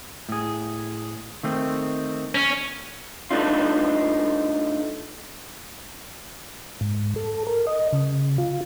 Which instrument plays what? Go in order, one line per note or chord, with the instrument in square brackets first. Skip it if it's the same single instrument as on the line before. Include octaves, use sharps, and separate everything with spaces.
[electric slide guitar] A2 G#4
D#3 A3 C4
[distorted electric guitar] C#4
[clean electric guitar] G2 A3 D4 D#4 F4
[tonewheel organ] G#2
A4
A#4
D#5
C#3
F4